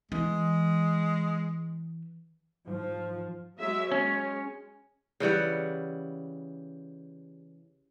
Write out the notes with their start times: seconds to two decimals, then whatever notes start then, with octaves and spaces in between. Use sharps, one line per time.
0.12 E3 G#3
2.67 G#2 F3
3.59 F#3 G#3 E5
3.92 G#3 C#4 C#5
5.20 C#3 E3 G3 F#5